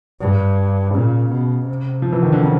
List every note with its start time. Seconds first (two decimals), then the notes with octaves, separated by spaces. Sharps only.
0.21 G2
0.94 A#2 C#3
1.32 B2
1.69 C3
2.02 F3
2.12 E3
2.23 D#3
2.32 D3
2.43 C#3